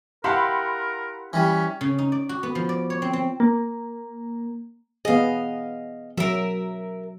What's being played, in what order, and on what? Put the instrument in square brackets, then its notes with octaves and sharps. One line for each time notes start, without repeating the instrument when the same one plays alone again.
[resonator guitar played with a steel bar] E4 G4 F5 [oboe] A#4 [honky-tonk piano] F#5 B5 C6
[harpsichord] E3 G3 [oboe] C#4
[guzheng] C#3
D#4
D5
F#4
B3
F3
D5
C#5
C4
C4
[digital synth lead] A#3
[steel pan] B3 G#4 [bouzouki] D#5 F5
[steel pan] F#3 [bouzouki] A#4 E5